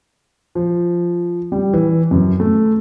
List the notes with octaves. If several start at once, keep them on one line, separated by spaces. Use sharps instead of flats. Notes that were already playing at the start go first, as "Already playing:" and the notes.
F3
G3
E3
F#2
A3